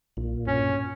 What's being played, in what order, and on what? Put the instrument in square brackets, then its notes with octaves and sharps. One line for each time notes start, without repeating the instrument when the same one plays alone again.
[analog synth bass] B1 [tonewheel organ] A#2
[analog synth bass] G2 [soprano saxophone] C#4